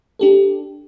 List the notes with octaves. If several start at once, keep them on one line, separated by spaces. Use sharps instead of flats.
D4 G4 A4